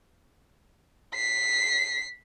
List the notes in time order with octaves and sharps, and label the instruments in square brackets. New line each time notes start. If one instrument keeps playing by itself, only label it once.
[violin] B6 C7